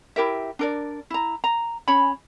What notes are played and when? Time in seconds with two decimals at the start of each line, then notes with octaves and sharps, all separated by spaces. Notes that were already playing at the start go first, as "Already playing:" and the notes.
0.16 E4 G4 A#4 E5
0.59 D4 A#4 D5
1.10 E4 A#5
1.44 A#5
1.88 C#4 C#5 G#5 B5